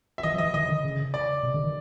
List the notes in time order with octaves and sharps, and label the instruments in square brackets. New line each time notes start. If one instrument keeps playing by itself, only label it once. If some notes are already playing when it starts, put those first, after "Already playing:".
[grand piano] E5
[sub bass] E3 [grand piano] D#5
[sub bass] F3
[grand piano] D#5
[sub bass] E3
[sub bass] D#3 [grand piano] D#5
[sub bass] D3
C#3
[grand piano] D5
[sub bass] C3
D3
D#3